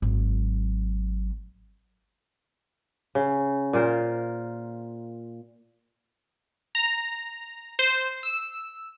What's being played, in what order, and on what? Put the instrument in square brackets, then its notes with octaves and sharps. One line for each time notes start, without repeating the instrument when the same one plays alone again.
[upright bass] G#1 F#3
[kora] C#3
A#2 F4 A#4 C5
[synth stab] A#5
C5
E6